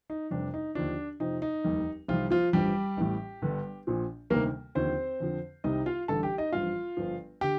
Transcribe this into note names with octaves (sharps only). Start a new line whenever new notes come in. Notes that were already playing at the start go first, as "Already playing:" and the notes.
D#4
F1 F2 C3 G3 D4
D#4
D#2 D3 F3 D4
F2 C3 F3 D#4
D#4
F1 D#2 D#3 G3
C2 C3 D#3 F3 G3 F4
F3 F4
A1 G2 F3 G3 G4
A1 A2 G3
G1 G2 D3 G3
A#1 A#2 F3
D2 C3 D#3 G3 A#3 A#4
D#2 D3 F3 C4 C5
F2 D3 F3
C2 C3 D#3 G3 D#4 D#5
F4 F5
A1 G2 D3 A4 A5
G4 G5
D#4 D#5
A1 G2 F3 F4 F5
G1 G2 F3
D3 G4 G5